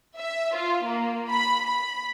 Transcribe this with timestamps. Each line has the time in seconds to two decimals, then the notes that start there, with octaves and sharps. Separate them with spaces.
0.17 E5
0.54 F4
0.85 A#3
1.30 B5
1.66 B5